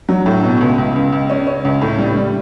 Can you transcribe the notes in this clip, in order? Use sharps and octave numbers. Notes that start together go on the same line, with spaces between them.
F#3
A2
B2
C#2
C#2
C#2
C#2
C#4
C#4
C#2
A2
G3
G3